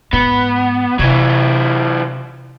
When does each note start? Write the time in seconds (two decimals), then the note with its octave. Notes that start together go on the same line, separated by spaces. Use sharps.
0.13 G#2 B3
0.99 C3 E3 F#3